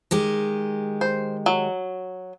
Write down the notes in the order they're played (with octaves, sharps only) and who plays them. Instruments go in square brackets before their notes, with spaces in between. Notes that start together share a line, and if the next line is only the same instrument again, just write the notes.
[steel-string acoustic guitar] D#3 G#3 G4
[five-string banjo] C5
F#3